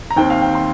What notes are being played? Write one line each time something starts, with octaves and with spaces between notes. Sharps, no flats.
A#5
D#2 D#3 C4 G5
F5
G5
C6